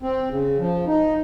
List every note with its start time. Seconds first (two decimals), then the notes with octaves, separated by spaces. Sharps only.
0.03 C4
0.31 C#3
0.59 F3
0.87 D#4